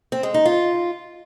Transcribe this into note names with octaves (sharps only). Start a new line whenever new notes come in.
C4
G#3
D#4
F4